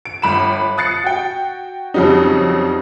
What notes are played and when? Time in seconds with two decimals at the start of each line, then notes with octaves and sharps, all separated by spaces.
0.05 D7
0.22 G1 B5 E7
0.78 D#6 F#6 A6 C7 C#7
1.04 F#4 G5
1.94 F2 C#3 F#3 G3 D#4